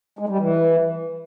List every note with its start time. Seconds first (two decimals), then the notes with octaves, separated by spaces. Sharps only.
0.19 G#3
0.29 G3
0.39 E3